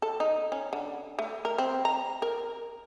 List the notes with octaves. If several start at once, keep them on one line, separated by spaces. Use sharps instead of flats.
A4
D#4
C#4
D3
A3
A#4
C4
A#5
A#4